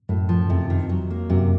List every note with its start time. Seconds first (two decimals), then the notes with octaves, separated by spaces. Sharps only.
0.09 F#2 A2
0.29 F3
0.49 F2 C3
0.70 D#3
0.89 F#3
1.10 A#3
1.30 F#2 C3